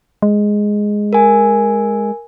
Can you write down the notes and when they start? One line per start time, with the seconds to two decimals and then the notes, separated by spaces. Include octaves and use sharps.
0.22 G#3
1.13 A#4 G#5